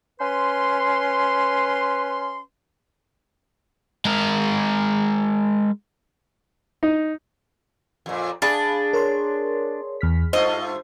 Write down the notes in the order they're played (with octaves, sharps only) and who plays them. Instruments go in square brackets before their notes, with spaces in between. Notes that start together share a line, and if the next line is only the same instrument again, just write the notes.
[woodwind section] C#4 B4 C6
[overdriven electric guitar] G#3 A#4
[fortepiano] D#4
[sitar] F2 A#2
[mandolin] D4 [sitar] G#4 [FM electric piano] F5 G#5 B5
[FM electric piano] A#4 C#5 C6
E2 F6 B6
[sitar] G2 A3 F4 [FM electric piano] C5 [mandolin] D#5